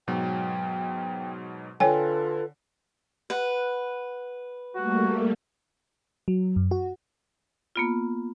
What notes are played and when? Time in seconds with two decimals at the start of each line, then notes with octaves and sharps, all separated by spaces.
0.07 G#2 B2 F#3 G5
1.80 D3 F4 A4 B4 C#5 G5 G#5
3.30 B4 F#5
4.75 G3 A3 A#3 F#4
6.28 F#3
6.56 F#2
6.71 F#4
7.76 A#3 B3 F4